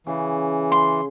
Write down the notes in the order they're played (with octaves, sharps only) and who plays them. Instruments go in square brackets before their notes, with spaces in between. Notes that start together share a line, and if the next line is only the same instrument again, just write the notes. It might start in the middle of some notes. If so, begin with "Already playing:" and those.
[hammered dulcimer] C#3 [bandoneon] E3
[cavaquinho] C6